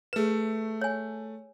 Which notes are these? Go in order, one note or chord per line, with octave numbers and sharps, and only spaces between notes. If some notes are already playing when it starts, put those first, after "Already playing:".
A3 G#4 B4 E7
C#5 G#5